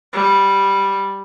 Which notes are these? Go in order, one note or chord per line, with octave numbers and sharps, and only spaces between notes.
G3